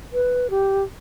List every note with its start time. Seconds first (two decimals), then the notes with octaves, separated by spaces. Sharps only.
0.13 B4
0.50 G4